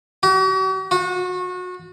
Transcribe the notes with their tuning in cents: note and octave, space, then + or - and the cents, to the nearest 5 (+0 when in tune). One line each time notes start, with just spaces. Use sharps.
F#4 +45
F#4 -30